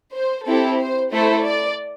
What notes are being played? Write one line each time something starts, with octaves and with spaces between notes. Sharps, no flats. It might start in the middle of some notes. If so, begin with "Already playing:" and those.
C5
C4 E4 G4 A4
C5
A3 E4 A4 C5
D5